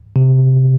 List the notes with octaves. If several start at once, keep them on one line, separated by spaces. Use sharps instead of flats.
C3